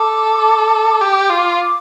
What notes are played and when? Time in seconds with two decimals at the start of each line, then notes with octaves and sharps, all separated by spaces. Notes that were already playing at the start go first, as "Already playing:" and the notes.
Already playing: A4 D6
1.01 G4
1.30 F4
1.59 D6